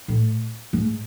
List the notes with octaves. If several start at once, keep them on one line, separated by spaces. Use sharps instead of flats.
A2
G#2